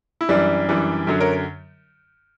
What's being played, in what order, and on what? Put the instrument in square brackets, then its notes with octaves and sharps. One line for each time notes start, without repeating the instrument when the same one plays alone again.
[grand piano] E4
F#2 E3 G3 D4
F#2 E3 G3 D4
F#2 D3 F#3
A#4 C#5